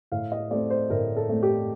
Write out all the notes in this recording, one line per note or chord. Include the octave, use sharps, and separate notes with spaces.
A2 F5
D#5
A3 C4 D5
C5
A2 A#4
A4
A3 C4
G4